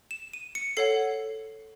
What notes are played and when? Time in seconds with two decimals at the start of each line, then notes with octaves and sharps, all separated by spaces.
0.11 E7
0.33 D#7
0.55 C#7
0.77 A4 C#5 F#5 C7